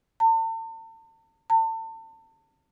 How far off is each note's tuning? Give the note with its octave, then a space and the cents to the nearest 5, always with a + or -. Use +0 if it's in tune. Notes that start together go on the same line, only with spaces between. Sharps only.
A5 +40
A5 +35